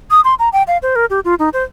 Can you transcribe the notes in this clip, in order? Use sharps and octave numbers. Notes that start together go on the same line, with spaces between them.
D#6
C6
A#5
G5
F5
C5
A#4
G4
F4
D#4
C5